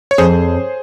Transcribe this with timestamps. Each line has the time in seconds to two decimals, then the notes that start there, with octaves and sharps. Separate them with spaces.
0.11 C#5
0.18 F2 G#4 C5